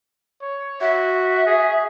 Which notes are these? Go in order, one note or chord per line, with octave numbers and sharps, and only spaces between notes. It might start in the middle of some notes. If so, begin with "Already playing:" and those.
C#5
F#4 E5
G#4